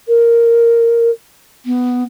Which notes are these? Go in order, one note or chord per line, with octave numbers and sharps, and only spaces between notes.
A#4
B3